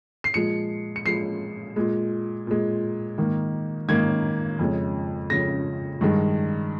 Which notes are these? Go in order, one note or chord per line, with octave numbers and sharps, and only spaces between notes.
C7
A#2 F3 G#3 C#7
C#7
A#2 F3 G#3 C7
A#2 G#3
A#2 G#3
G#2 D#3 A#3
G#2 D#3 A#3 G#6
F2 C#3 G#3
F2 C#3 G#3 A#6
G2 D#3 G#3